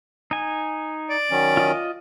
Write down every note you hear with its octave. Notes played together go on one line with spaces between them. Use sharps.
D#4 G#5
D5
D#3 F#3 C#4
F4 D#5